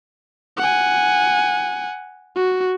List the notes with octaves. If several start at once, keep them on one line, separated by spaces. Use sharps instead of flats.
F#5 G#5
F#4